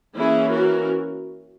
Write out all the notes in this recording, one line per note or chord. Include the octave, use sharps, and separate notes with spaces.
E3 A#3 C#4 E4 G#4
F#4 A#4